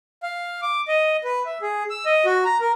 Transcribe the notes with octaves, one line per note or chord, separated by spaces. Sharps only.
F5
D6
D#5
B4
E5
G#4
E6
D#5
F#4
A#5
A#4